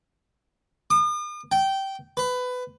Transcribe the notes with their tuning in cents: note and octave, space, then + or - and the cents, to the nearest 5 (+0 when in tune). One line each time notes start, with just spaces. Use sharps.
D#6 -45
G5 -15
B4 +20